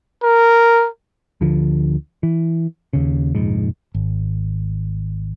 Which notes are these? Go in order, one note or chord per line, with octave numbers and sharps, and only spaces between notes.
A#4
D2 D3 F3
E3
D#2 C#3
F1 A#1 G#2
G#1